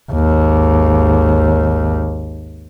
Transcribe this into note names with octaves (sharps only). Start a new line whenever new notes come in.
G#1 D#2